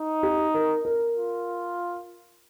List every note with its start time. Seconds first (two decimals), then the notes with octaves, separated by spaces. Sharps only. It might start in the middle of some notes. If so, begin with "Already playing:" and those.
Already playing: D#4
0.23 G4
0.54 A#4
0.85 A#4
1.16 F4